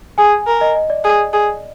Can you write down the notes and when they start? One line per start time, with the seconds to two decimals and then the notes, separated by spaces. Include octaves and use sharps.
0.18 G#4 G#5
0.47 A#4
0.61 D#5
0.75 D#5
0.90 D5
1.04 G#4
1.33 G#4